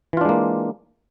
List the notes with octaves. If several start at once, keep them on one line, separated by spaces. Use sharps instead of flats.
E3 G#3 A#3 D4 F4